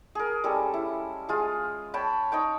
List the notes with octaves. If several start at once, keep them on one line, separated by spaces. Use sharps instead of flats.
G#4 A#4
G3 G#3 C#4 A4
E4
G#3 F4 G#4
C#5 G5 A5 B5
D#4 C#5 G5